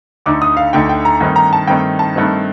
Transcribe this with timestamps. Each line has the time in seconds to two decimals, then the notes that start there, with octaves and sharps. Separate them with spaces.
0.26 D2 D3 A3 D#4 D6
0.42 D#6
0.57 F5
0.73 D2 D3 A3 D#4 G5
0.89 G5
1.05 A#5
1.21 G2 D#3 A3 C4 D#4
1.36 A#5
1.53 A5
1.67 G2 D#3 A3 C4 D#4 G5
1.99 A5
2.15 G2 D#3 A3 C4 D#4